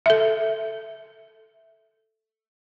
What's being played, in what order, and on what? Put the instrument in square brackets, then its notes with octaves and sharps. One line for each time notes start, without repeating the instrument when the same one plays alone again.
[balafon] A4 E5